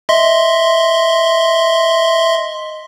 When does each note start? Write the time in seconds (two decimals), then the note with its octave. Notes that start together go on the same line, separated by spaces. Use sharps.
0.09 D#5 E5 C6